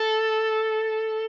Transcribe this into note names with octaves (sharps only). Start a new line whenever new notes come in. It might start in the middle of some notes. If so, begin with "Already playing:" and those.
Already playing: A4